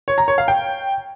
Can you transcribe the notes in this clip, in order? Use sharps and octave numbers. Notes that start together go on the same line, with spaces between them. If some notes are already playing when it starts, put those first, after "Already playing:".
C#5
A#5
C#5
F5
G5